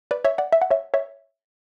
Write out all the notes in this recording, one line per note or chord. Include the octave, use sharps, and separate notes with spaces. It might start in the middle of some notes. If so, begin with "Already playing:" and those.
B4 D5
C#5 E5
D5 F#5
E5
F#5
C#5 E5
C#5 E5